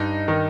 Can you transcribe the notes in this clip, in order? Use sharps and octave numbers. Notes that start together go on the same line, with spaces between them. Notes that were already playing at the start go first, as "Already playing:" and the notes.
Already playing: G2 D#4
D#3